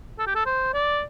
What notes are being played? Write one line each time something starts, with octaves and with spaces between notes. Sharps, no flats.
A4
G4
A4
C5
D5